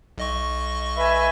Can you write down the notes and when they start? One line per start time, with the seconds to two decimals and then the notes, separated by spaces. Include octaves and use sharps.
0.18 B1 D#5 C#6
0.97 B4 E5 G#5